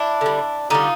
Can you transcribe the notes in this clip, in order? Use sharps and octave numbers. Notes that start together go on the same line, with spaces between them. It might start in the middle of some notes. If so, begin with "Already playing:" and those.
Already playing: D4 E4
D3 G3
D3 G3 D#4 F4